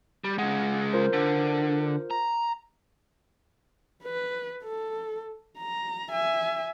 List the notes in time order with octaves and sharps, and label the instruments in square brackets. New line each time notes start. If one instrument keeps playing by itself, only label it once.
[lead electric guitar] G3
[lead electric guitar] C#3 G#3 [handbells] F#5
[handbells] F4 A#4 C5
[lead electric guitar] D3
A#5
[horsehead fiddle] B4
A4
A#5
E5 G#5